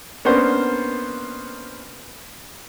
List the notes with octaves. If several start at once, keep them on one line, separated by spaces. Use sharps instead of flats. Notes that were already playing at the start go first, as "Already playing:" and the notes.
A#3 B3 C#4 D4 C5